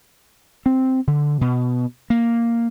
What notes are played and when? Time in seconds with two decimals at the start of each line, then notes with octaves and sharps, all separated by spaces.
0.66 C4
1.07 D3
1.41 B2
2.10 A#3